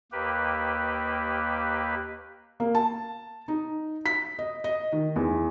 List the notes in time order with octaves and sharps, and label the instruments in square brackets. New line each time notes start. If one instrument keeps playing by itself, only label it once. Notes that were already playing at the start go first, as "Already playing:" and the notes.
[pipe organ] D#2 A#3 G4 B4
[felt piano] A#3
A5
D#4
B6
D#5
D#5
D#3
E2